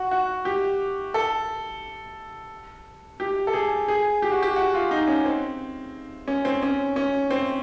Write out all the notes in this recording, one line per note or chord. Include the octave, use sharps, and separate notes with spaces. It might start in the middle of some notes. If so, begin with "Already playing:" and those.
Already playing: F#4
F#4
G4
A4
G4
A4
G#4
G#4
G4
F#4
G4
F#4
F4
D#4
C#4
C4
C#4
C4
C#4
C#4
C4